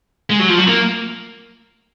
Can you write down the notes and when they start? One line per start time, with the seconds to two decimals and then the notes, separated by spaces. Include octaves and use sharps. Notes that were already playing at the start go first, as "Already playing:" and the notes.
0.30 G#3
0.39 F#3
0.49 F3
0.58 F#3
0.68 A#3